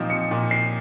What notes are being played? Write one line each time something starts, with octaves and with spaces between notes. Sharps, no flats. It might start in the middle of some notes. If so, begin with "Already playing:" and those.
Already playing: A#2 F3 C4 D#4
C#7
A#2
C7